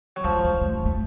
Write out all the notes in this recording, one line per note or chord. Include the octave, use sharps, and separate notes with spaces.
F#3
F3 G#3
G#3
A3
A#3
A3